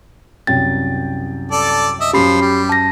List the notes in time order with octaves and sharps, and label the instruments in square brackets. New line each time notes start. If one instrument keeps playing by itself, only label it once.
[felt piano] C2 F#2 G5 [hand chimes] A6
[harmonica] A4 D5
D#5 E5
[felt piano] F#2 C#4 [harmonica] F3 [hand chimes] G4 B5 C7
[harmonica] G3
[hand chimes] A5 A#6